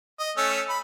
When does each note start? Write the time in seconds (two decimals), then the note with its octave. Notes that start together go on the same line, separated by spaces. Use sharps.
0.19 D#5
0.37 A3 C#4 E6
0.69 B5